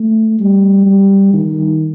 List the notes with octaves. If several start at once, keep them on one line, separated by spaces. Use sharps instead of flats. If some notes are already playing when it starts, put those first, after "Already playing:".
Already playing: A3
G3
G3
D#3